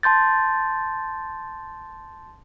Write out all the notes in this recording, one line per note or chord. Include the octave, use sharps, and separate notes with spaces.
A5 C6 G6 A6